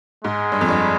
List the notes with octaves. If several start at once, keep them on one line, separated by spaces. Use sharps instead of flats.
G#2 G#3
G2
F2
G2